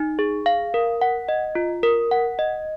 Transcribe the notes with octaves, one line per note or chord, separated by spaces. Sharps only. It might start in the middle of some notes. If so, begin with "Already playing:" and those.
Already playing: D#4
G#4
F5
A#4
F#5
D#5
F4
A#4
F#5
D#5